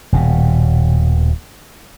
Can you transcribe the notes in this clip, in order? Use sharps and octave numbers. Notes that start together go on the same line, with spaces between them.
D#1 B2